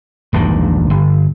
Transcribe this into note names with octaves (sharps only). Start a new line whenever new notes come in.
E1 A#1 G2 D#3
G1